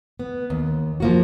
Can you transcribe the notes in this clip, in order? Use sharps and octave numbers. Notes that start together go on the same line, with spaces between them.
B3
D#2
F3 A#3 F#4